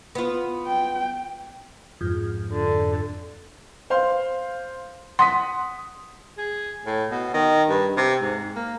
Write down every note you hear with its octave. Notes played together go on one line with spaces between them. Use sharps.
B3 F4
G5
F2 G#2
D3
C5 F5 C6
F#5 C6 D#6 B6
G#4
A2
B2
D#3
G2
C3
G#2
A#3